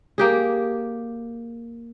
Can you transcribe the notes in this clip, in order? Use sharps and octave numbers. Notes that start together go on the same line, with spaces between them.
A#3 G4 G#4